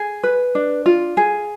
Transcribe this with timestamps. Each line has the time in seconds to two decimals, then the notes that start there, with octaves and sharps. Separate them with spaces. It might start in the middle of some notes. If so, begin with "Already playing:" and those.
Already playing: G#4
0.23 B4
0.55 D4
0.86 F4
1.17 G#4